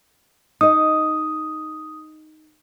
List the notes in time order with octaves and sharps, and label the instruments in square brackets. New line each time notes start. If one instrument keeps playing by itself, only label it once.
[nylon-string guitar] D#4 D#5 [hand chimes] D#6